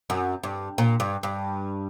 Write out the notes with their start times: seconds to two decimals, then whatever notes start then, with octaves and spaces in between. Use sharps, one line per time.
0.10 F#2
0.44 G2
0.78 A#2
1.00 G2
1.23 G2